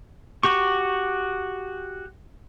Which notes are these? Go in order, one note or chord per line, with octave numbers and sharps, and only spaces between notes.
F#4 G4 C#6